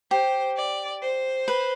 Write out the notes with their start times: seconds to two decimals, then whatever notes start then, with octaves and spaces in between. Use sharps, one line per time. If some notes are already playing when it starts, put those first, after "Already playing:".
0.11 G4 C5
0.57 D5
1.02 C5
1.48 B4